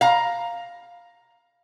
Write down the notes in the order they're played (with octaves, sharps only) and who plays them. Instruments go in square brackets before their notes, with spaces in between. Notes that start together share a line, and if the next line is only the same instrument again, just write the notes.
[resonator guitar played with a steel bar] F5 A#5